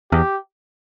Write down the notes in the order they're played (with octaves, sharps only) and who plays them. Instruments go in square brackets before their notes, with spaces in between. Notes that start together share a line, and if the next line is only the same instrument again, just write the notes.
[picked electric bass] E2 [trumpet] G4